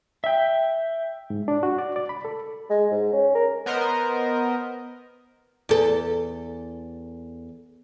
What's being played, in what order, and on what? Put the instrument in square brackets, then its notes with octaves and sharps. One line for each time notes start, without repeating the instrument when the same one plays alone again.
[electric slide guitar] E5 G5
[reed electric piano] G#2
D4
F#4
D5
D5
B5
A4
[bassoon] G#3
G#2
C#4
A#4
[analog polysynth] B3 A#4 C5 D#5
[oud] E2 A4